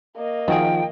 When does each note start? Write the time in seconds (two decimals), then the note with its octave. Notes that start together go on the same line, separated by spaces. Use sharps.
0.17 A#3 D#5
0.48 D#3 F3 D#4 F4 F#4 G#4 G5